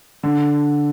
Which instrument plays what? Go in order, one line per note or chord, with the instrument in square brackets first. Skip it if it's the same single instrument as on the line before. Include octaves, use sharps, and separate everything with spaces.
[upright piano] D3